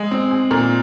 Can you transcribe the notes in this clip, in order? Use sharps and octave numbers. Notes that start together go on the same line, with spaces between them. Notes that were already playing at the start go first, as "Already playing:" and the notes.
Already playing: G#3
C4
G#4
A#2